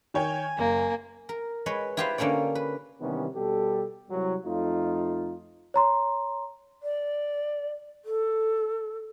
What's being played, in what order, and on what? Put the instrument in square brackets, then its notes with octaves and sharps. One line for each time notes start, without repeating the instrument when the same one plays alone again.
[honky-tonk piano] D#3 C#5 G5 [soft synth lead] G#5
[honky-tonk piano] F#1 [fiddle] A#3
[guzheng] A#4
G#3 B4 C#5
E4 F4 G4 B4 C5 F5
D3 A#3 C#4 C#5 D5
B4
[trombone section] C3 D#3 E3 G3 B3 C#4
B2 G3 G4 A4
C2 F#3
F2 A3 D#4 F4
[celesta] C#5 A#5 C6
[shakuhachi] D5
A4